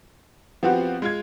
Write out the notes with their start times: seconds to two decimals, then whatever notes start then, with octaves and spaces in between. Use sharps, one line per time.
0.63 F3 B3 C4 F#4 G4
1.02 G#3 F4 G#6